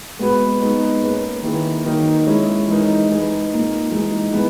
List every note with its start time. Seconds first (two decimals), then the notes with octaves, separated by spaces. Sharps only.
0.19 G#3 B3 F#4 B4
0.61 G#3 B3 D#4 F#4
1.02 A#3 C#4 G#4 B4
1.43 D#3 A#3 E4 G#4 B4
1.85 D#3 F#3 A#3 D#4 A#4
2.26 G#3 C#4 E4
2.68 E3 G#3 D#4 A#4
3.09 G#3 D#4 G#4 B4
3.51 A#2 A#3 D#4
3.91 E3 G#3 D#4 F#4
4.33 E3 G#3 B3